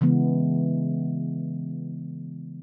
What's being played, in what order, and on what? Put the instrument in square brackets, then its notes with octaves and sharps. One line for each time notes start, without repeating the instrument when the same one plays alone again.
[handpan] C#3 E3 G#3 B3